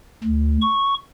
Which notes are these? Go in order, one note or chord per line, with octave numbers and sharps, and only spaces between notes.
D2
C#6